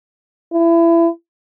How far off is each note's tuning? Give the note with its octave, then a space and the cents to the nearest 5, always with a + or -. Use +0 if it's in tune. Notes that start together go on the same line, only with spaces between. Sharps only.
E4 +25